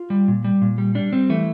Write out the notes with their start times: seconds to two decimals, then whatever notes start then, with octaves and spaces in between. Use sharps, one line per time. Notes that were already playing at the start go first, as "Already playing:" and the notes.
Already playing: F4
0.10 G3
0.28 A#2
0.44 G3
0.62 A#2
0.78 G3
0.95 G3 D4
1.12 G3 C4
1.29 E3 A3